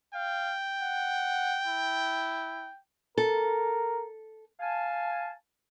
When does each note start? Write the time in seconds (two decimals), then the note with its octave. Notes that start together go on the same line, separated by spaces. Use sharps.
0.15 F5 G5
0.81 F#5
1.67 E4
3.18 A4 A#4
4.60 F5 G#5 A5